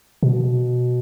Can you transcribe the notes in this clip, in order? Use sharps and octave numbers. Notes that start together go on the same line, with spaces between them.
B2